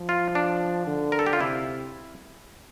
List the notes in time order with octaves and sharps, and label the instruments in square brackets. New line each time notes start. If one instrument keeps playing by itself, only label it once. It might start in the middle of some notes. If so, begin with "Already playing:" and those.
Already playing: [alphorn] F3
[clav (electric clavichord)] F4
D4
[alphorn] D3
[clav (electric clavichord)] A#4
A4
G4
F4
[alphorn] C3 [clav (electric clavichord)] E4